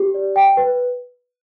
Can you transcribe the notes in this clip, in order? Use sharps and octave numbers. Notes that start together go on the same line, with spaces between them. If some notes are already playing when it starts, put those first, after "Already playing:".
Already playing: G4
D5
G5
B4